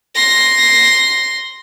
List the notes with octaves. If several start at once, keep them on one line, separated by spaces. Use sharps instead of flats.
C6 A#6